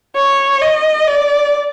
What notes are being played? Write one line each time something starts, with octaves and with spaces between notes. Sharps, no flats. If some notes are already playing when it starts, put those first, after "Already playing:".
C#5
D#5
D5